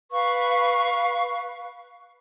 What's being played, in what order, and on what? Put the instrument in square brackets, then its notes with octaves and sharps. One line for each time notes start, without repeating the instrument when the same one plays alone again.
[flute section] B4 F5 C#6